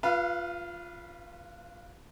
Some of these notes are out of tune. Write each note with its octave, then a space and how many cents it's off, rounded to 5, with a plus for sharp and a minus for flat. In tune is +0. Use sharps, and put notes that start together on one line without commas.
F4 +0 B4 -15 F5 -40